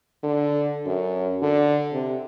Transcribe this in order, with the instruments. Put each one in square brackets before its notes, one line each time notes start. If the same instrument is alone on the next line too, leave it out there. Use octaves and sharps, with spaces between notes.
[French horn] D3
F#2
D3
C3